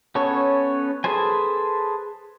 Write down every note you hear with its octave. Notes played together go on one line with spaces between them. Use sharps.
B3 C#4 A4 C#5
G#4 A4 B4 C5 G#5